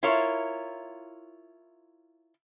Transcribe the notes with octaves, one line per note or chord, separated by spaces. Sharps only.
E4 F4 A#4 C#5